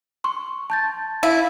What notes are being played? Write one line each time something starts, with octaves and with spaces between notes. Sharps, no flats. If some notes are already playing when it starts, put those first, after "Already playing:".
C6 C#6
A5 G6 A6
E4 F5